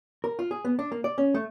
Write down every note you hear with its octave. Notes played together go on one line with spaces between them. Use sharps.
A#4
F4
G#4
B3
D4
A#3
D5
C#4
A3